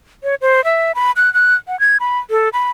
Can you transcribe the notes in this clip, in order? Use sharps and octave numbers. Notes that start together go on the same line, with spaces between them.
C#5
C5
E5
B5
F#6
F#6
F#5
G#6
B5
A4
B5